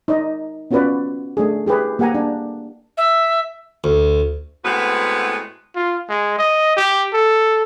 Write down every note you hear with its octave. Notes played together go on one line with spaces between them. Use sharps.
D#4 D5 D#5
B3 C#4 F4 F#4 B4 D5
A3 D4 G#4
E4 G4 G#4 B4
A#3 G4 F#5 G#5 A#5
D4
E5
D2
A2 G#3 B3 C4 F#4 B4
F4
G#3
D#5
G4
A4